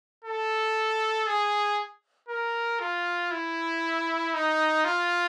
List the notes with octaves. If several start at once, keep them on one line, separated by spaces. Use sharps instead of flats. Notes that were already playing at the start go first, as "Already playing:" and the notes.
A4
G#4
A#4
F4
E4
D#4
F4